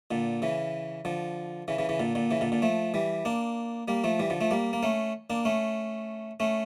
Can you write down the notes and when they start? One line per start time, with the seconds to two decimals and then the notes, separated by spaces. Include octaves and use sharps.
0.11 A#2 D3
0.42 C#3 E3
1.05 D3 F3
1.68 C#3 E3
1.78 C#3 E3
1.89 C#3 E3
2.00 A#2 D3
2.15 A#2 D3
2.31 C#3 E3
2.41 A#2 D3
2.52 A#2 D3
2.62 F3 A3
2.94 E3 G3
3.25 A#3 D4
3.88 G3 A#3
4.04 F3 A3
4.20 E3 G3
4.30 D3 F3
4.41 F3 A3
4.51 G3 A#3
4.73 A#3
4.83 A3 C#4
5.30 A#3 D4
5.45 A3 C#4
6.40 A3 C#4